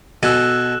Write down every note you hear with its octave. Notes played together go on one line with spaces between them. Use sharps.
B2 A4 G#5 E6 F#6 E7